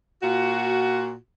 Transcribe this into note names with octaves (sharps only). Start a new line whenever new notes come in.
A#2 F4 F#4